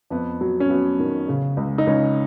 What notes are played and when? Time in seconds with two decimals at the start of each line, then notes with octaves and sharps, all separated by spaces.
0.10 F2 B3
0.41 F#3
0.60 C#4
0.70 F#3 B3
0.99 D#3
1.28 C#3
1.57 C#2
1.78 D#4
1.87 C#2 C#4